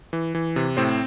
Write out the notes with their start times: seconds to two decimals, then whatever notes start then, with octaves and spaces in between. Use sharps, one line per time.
0.13 E3
0.35 E3
0.56 C3
0.77 A2 C4 C5